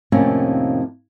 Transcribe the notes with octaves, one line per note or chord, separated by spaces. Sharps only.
F2 A2 C3 D#3 A#3 C#4